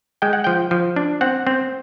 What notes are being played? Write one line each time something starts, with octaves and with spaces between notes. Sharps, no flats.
G#3 G5
F#5
F3 G5
F3
D4
C4 F#5
C4